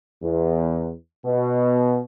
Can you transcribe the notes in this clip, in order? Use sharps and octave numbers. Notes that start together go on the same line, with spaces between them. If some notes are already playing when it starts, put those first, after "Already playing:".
E2
B2